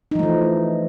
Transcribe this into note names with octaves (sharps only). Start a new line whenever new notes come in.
E3 F3 A3 D#4